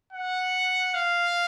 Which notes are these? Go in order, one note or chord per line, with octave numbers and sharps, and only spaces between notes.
F#5
F5